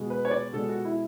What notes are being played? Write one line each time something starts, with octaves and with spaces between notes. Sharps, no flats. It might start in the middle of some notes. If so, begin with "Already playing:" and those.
Already playing: B2 G#3
B4
C#5
D5
B2 G#3 A4
F#4
E4